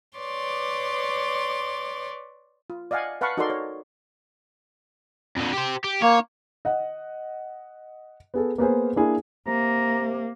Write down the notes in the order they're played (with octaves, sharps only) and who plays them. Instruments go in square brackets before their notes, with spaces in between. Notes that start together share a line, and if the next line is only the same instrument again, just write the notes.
[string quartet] B4 C#5 D5 C6 D6
[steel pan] F4
D5 D#5 F5 F#5 G#5
B4 F5 F#5 A5 B5 C#6
D#4 F#4 A4 A#4 D5 C6
C#5
[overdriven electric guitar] F2 D3
G4 C5
G4
[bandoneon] A#3 [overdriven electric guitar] C#5
[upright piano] D#5 F#5
B3 G#4 A4
A#3 B3 G#4 C5
A#3 D4 E4 G#4
[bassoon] C3 [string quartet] A#3 [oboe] A#5